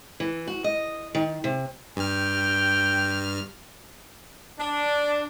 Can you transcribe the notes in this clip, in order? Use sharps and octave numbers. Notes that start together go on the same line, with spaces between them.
E3
F#4
D#5
D#3
C3
G2 G5 F6
D4